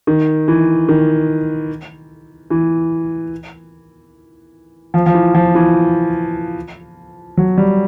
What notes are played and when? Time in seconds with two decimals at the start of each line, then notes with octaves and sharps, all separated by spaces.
0.07 D#3
0.48 E3
0.88 D#3
2.50 E3
4.94 F3
5.06 F3
5.14 E3
5.34 F3
5.55 E3
7.37 F#3
7.58 G3